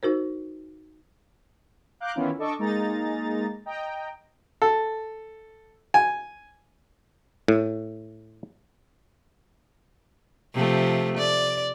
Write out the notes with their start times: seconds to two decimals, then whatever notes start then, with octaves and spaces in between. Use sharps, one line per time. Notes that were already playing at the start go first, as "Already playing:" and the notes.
0.03 D#4 F#4 A#4 C5
2.00 F5 A#5 D6 F#6 G6
2.15 D#3 E3 B3 C#4 E4 F4
2.38 D4 A4 D#5 A5 C#6 D6
2.59 G#3 A#3 D#4 G#4 A#5 A6
3.66 D#5 G5 A#5
4.62 A4
5.94 G#5
7.48 A2
10.54 C3 F3 A3
11.17 D5